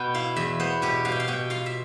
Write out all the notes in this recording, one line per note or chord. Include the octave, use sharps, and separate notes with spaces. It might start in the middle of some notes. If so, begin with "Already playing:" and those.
Already playing: B2 B3 G5
E4 F5
E2 E5
B3 C5
B2 G4
B2 F5
G5
F5
B2 G5
F4 F5
E5